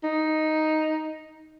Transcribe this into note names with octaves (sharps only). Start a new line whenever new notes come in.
D#4